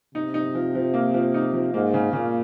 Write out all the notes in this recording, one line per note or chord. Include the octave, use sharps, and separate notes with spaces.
C3 D#4
D#4
F3
F3
A#3
F3
D#4
F3
G#2 A#3
C#3
A#2 C#3